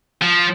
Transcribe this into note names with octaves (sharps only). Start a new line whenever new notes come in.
F3